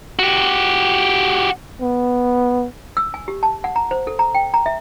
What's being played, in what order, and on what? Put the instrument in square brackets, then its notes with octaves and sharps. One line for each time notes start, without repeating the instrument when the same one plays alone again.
[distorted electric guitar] F#4 G4
[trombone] B3
[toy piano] E6
G#5
G4
A5
F#5
A#5
C5
A4
A#5
G5
A#5
E5